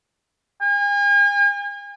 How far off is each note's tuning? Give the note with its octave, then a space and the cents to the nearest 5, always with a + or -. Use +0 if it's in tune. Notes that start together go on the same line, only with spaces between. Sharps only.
G#5 -40